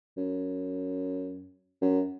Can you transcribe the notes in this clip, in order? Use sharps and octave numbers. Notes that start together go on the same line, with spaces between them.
F#2
F#2